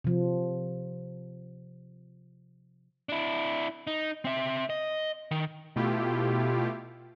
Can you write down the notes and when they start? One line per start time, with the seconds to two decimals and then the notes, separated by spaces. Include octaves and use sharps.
0.05 C3 F3
3.09 D4 E4
3.87 D#4
4.25 C4 E5
4.70 D#5
5.31 D#3
5.76 B2 A3 E4 F4 G4